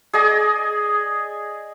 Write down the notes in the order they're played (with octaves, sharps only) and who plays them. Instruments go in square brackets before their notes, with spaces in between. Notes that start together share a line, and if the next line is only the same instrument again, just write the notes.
[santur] G#4 D5 D#5 G#5